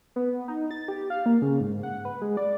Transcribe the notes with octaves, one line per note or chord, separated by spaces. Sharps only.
B3
D#4
A6
G4
F5
A#3
C#3
G#2
F#5
B4
G#3
D5